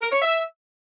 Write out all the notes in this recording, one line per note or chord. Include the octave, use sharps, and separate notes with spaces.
A#4
C#5
E5